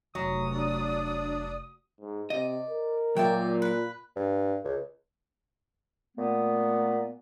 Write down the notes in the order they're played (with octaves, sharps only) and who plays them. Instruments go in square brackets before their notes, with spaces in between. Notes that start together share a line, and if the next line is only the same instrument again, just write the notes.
[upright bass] F1 [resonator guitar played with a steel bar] F#3 [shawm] D#6
[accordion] D4 D5
[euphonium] G#2
[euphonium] C3 [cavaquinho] D5 [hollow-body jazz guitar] D#5
[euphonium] A#4
[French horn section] A#2 [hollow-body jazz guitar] F#3 [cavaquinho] D5 E5 G5
[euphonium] F4 [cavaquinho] B4
[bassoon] G2
C#2
[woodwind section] A#2 A3 B3